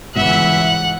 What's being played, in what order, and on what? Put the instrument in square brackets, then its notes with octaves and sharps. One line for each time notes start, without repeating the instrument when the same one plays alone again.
[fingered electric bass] G1 G#2 B2 [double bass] C#2 E3 [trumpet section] E5 [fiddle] F#5